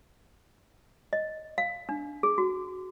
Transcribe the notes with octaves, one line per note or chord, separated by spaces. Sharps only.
D#5
F5
D4
G#4
F#4